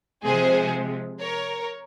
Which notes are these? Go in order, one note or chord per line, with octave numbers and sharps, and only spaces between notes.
C3 F3 G#3 G#4 C5
A#4 C#5